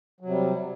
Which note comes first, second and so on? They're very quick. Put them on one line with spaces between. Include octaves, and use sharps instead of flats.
F#3 C3 G3